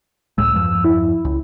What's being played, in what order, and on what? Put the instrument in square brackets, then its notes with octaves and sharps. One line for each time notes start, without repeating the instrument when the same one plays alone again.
[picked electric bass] C#2 A2 G#3 [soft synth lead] E6
[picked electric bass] E2 G2 F3
[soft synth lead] E4
[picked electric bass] C#2